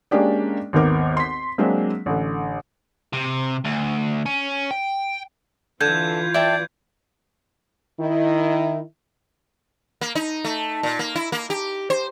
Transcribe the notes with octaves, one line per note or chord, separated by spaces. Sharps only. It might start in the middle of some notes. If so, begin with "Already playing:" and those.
G#3 A#3 C#4 D4 G4 D5
G#1 D#2 B3 A#4 D6
C6 B6
F#3 G#3 A#3 C4 D4
A1 D3
C3
D2
C#4
G5
D3 E3 F4 A4 G6 G#6
D5 E5 G5 A5
D#3 E4
A#3
D#4
A3
A#2
A#3
E4
A#3
G4
C5